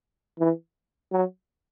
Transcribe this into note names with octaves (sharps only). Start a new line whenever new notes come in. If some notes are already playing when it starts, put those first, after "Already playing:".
E3
F#3